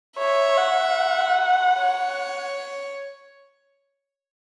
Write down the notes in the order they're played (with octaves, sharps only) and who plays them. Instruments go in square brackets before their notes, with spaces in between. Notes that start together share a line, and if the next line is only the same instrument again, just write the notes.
[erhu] C#5 [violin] E5
[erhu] F#5
[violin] C#5